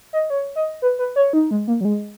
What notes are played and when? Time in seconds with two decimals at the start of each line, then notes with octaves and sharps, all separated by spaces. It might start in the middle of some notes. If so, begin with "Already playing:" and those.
0.13 D#5
0.30 C#5
0.56 D#5
0.82 B4
0.99 B4
1.16 C#5
1.33 D#4
1.51 G#3
1.68 A#3
1.81 F#3
1.85 G#3